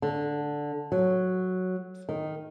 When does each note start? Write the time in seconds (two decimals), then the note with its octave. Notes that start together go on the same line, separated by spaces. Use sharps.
0.02 D3
0.92 F#3
2.09 D#3